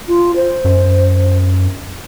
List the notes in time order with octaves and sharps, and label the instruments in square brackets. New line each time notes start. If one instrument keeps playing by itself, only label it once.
[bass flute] F4
C5
[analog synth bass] F#2